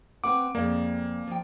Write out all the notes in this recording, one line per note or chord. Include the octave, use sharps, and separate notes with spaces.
C4 B4 F#5 D6
F2 G#3 A#3 D5
F3 G5